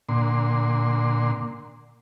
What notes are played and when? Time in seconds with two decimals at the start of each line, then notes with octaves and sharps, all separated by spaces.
0.09 A#2 D3 C6